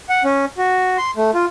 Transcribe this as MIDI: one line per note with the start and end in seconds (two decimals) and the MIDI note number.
0.09 0.23 78
0.24 0.45 61
0.58 0.97 66
0.98 1.11 84
1.17 1.31 57
1.34 1.45 65